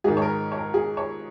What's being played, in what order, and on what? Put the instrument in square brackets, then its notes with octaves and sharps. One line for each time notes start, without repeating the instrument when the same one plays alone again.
[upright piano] G#2 D#3 G#4
C#5
A#4
C#5
A#4
G#4
C#5